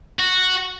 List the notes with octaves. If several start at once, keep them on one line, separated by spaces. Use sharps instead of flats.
F#4